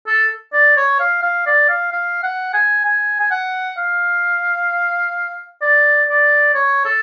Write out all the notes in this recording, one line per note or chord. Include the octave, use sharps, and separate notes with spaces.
A4
D5
C#5
F5
F5
D5
F5
F5
F#5
G#5
G#5
G#5
F#5
F5
D5
D5
C#5
A4